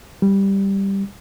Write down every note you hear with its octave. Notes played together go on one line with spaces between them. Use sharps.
G3